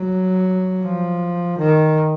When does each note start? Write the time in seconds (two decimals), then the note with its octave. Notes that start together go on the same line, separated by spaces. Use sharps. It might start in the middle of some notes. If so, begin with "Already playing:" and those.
Already playing: F#3
0.82 F3
1.58 D#3